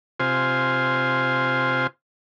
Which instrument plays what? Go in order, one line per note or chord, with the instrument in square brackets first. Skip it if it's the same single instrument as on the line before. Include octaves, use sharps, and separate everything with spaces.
[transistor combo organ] C3 F4 C5 G#5